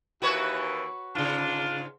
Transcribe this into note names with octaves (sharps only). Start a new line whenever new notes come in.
D#2 E3 F#4 B4 C#5
G#2 C#3 D4 F4